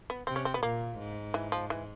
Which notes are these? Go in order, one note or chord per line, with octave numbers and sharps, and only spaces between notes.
B3
C3 C4
C#4
C4
B3
A#2 A#3
G#2
E3
F3
E3